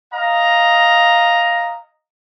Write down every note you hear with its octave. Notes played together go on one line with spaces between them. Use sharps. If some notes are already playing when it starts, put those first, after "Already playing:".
D#5 F5 A#5